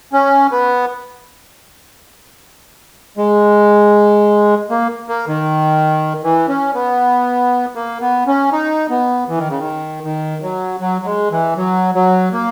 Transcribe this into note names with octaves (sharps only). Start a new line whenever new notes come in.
C#4
B3
G#3
A#3
A#3
D#3
E3
C#4
B3
A#3
B3
C#4
D#4
B3
E3
D#3
C#3
D#3
D#3
F#3
F#3
F#3
G#3
E3
F#3
F#3
A#3